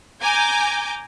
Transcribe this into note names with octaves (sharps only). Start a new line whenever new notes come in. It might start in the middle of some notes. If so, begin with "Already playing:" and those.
G#5 A#5 D6 G6